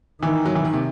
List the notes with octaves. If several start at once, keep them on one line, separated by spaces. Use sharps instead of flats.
D#3 E3
F#3
E3
D#3
C3